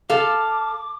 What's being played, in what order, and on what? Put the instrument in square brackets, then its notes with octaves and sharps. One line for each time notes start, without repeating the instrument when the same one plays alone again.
[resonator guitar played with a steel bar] A4 F5 [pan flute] D6